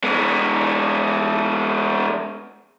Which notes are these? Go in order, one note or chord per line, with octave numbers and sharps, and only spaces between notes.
G#3 B3